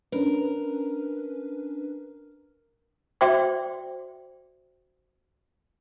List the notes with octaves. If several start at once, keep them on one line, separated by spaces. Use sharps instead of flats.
C#4 D4 A#4 B4
F#4 C5 D5 E5 G5 D6